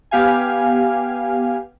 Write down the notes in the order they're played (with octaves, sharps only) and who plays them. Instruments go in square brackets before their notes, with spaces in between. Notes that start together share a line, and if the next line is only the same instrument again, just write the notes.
[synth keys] B3 G4 F5 G#5